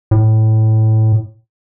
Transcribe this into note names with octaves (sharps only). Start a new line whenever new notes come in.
A2